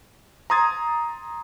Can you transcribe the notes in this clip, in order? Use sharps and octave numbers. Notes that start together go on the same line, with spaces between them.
A#5 C6 D#6 G#6 A6